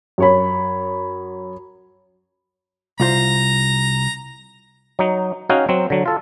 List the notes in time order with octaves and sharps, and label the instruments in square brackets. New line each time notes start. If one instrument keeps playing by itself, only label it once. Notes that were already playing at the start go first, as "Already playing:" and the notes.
[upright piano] F#2 C#5 B5
[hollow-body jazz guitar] C2 F4 C5 [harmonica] A#5
[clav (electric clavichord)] F#3 D#4
C#4 D#4 F#4 G#4 F5 G5
F#3 C4
D3 F#3
F4 A4